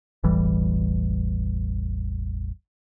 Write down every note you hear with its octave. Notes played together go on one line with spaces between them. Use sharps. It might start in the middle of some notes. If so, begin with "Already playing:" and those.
E1 A1 E3 G3